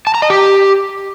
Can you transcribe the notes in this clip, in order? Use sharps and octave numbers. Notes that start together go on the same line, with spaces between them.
A5
A#5
D#5
G4